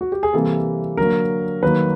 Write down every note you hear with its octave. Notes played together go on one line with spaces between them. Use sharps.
F#4
G4
G#4
C3 E3 G3 A#3 A4
D3 F#3 A#3 A#4
D#3 F#3 A#3 B4